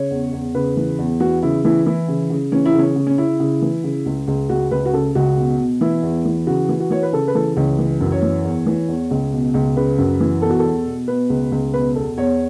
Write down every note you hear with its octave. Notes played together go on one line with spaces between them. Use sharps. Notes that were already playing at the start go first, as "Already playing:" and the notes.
Already playing: C#3 C#5
E2
E2
C#3 B4
E3
E2
E3 F#4
C#3 E4
E3 E4
E3 E4
C#3
C#3
E3 C#4
E4
C#3
C#4
C#3
C#4
C#3 E4
C#3
E3
C#3
C#2
C#2
C#2 F#4
C#2 B4
F#4
C#3 A4
C#2 F#4
B2
B2
E3 E4
E2
E3
C#3 F#4
E3
F#4
E3 C#5
B4
C#3 A4
B4
E3 A4
C#2 C#4
E3
F#2
C#5
E3
E2
E3
E2
C#2
B2
C#2
C#3 B4
F#2
E3
B2 A4
F#4
E2 A4
B2
B2 B4
C#2
C#2
B2 B4
E2 A4
E2 C#5